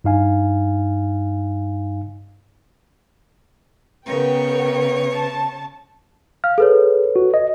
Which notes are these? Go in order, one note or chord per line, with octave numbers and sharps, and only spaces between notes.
G2 D#4 F5 G#5
C#3 B3 A#4 B4 C#5 G5
A5
F5 F6
G#4 A4 B4 C#5
F#4
D#5